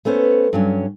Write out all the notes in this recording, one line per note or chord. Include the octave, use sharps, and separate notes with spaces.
A3 B3 C#4 C5
G2 F#3 C#4